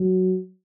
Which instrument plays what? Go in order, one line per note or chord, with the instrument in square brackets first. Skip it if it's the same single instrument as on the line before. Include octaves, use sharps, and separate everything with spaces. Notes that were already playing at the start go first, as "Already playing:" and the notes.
Already playing: [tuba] F#3